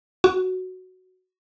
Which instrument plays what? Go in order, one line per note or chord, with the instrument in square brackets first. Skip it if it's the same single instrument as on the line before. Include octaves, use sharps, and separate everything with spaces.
[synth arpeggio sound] F#4